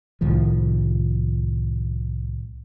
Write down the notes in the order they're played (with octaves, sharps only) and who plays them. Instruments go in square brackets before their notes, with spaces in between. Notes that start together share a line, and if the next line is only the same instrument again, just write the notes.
[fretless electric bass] C2 A2 D#3 F3